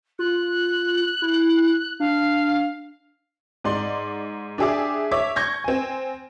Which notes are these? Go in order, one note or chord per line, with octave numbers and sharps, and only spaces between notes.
F4 F#6
E4
D4 F5
G#2 D5 C6
D4 G4 G#4 E5 D6
C#5 E5 D6
C#6 G6 G#6 A#6
C4 G#5